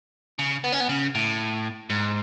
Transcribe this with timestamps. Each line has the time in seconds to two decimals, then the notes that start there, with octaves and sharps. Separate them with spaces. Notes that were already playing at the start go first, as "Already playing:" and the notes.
0.39 C#3
0.64 B3
0.72 C#4
0.80 B3
0.89 C#3
1.15 A2
1.90 G#2